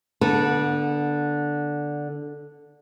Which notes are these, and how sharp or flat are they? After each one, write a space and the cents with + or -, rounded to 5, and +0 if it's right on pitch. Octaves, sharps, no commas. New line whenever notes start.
D3 +0 B3 -30